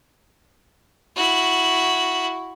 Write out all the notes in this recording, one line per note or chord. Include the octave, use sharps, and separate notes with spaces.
E4 F#4